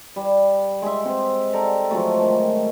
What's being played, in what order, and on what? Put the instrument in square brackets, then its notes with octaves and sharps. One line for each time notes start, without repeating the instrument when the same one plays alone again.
[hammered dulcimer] G3
G#3 E5
C4 F#5
G4 A4 D5 A#5
F3 F#3 G#3 A3
D#3